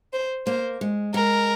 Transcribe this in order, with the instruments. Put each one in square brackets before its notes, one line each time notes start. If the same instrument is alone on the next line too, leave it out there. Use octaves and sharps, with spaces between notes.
[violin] C5
[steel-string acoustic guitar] A#3 [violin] C5
[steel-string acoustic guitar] G#3
[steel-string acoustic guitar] G#3 [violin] A#4